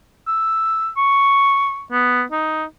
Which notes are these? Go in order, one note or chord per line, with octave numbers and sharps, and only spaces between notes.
E6
C#6
B3
D#4